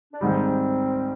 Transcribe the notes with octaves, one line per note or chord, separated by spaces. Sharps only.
D4
G#2 D#3 G3 C4